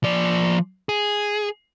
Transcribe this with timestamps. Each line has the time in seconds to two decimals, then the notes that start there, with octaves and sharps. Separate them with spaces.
0.04 F3 D5
0.89 G#4